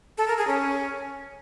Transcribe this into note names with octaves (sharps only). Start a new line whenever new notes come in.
A4
A#4
G#4
C#4